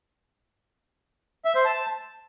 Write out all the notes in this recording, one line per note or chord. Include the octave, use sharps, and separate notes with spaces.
E5
C5
A5